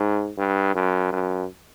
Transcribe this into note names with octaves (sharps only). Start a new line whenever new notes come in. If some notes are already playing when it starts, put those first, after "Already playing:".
Already playing: G#2
G2
F#2
F#2